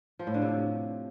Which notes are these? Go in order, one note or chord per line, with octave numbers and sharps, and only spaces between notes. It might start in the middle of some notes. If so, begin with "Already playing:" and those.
F3
A2
D3
C3